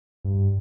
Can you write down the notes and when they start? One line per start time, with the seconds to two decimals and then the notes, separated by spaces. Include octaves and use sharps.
0.24 G2